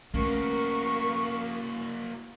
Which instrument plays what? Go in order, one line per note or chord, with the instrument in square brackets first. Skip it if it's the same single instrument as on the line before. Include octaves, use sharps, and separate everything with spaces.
[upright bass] A3 C#4 [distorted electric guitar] A#3 F#4 [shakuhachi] A#4 [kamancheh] F5 C#6